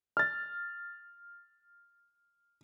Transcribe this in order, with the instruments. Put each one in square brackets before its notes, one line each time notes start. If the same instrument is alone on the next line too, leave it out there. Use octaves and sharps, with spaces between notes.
[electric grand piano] F6 A6